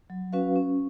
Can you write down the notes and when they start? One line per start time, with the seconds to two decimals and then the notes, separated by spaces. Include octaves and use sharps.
0.10 F#3
0.33 C#4 F#4 B4 F5
0.56 C#4